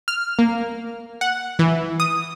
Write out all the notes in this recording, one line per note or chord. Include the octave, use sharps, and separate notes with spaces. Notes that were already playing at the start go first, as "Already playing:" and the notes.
F6
A#3
F#5
E3
D#6